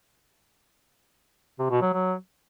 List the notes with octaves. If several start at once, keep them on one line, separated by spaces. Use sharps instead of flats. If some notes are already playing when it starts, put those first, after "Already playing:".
C3
B2
F#3
F#3